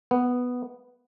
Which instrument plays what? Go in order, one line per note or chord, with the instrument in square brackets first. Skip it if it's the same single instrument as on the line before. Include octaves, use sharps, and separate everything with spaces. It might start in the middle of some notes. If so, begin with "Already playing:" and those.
[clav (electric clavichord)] B3